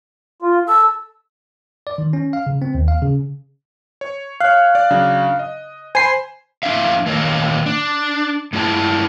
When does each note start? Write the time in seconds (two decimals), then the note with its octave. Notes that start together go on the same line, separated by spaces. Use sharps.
0.42 F4
0.68 A4 E6
1.87 D5
1.98 D#3
2.13 C#4
2.33 F5
2.46 C#3
2.62 C4
2.74 D#2
2.88 F5
3.02 C#3
4.01 C#5
4.41 C#5 F5 F#6
4.75 D5 F#6
4.91 C#3 F#3 D4
5.39 D#5
5.95 C5 G#5 B5 C6 C7
6.63 F2 G3 D4 E5 F5
7.06 A#2 D#3 A#3 A#4 C#5 D#5
7.66 D4
8.53 G2 G#3 E4 D5 A5